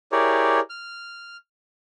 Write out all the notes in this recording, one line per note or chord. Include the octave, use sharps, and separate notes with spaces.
E4 G4 G#4 A#4 C#5 D5
F6